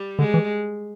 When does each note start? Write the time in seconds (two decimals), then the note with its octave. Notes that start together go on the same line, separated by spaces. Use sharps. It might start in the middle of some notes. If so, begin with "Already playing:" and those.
Already playing: G3
0.19 D3 G#3
0.34 E3